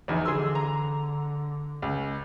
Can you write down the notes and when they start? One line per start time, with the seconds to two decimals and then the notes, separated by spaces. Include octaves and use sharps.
0.08 A#1 E2 D#4
0.25 D3 G#4 C6 E6
0.55 A#5
1.82 C#2